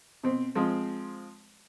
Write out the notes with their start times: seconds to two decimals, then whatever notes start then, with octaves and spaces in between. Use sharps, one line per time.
0.23 B2 C4
0.55 F3 G#3 C4